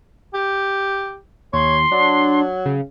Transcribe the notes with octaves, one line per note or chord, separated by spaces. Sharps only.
G4
D#2 C#5 C6
F#3 D4
C#3